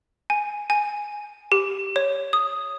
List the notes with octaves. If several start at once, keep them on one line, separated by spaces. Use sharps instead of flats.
G#5
G#5
G4
C#5
D#6